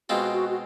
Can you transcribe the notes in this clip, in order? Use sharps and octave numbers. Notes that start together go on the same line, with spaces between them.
B2 G#3 C4 F4 F#4
F#4
F#4